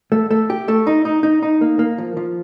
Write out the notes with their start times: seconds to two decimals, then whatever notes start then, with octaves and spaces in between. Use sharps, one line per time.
0.12 A3
0.31 A3
0.50 G4
0.68 A3
0.87 D#4
1.05 D#4
1.23 D#4
1.43 D#4
1.61 A#3
1.79 A#3
1.98 F3
2.17 F3